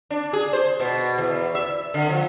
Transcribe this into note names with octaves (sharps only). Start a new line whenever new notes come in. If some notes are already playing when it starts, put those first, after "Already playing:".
D4
G#4
C5
B2
E2
E5
D3
F3